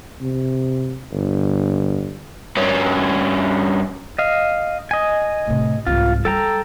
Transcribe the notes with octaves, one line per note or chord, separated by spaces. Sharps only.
C3
G1
G2 C#4
D#5 F5
D#5 G#5
A2 C3
C2 G#2 F4
G3 A4 G5 A#5